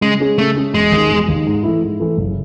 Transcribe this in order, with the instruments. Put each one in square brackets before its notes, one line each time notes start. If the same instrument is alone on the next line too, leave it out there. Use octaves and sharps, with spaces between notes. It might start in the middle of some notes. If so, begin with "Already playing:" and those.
[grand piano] C#3 [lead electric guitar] G#3
[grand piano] G#3 C#4 G#4
[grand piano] C#3 [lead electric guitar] A3
[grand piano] G#3 C#4 G#4
[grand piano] E1 [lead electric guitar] G#3
[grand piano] D#2 D#3
E1
D#2 D#3
G#2
E3 A3 E4
G#2
E3 A3 E4
F#1